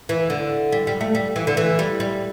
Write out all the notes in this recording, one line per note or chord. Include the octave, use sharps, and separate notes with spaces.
E3
D3
G3
G3
A3
G3
E3
D3
E3
G3
G3